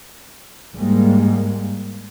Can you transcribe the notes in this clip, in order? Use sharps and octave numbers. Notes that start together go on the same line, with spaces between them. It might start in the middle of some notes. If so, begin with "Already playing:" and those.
G#2 G3 G#3 A#3